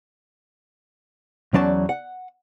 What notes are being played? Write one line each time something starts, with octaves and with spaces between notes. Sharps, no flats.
E2 F#3 C#4 D5 A5
F#5